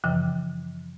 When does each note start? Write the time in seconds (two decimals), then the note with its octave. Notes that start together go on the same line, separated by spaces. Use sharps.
0.04 F#2 C#3 E3 F3